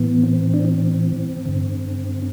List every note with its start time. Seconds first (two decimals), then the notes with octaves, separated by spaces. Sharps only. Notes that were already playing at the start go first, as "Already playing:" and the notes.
Already playing: A2 E3 B3
0.23 C4
0.54 D4
0.65 C4
1.46 G2 D3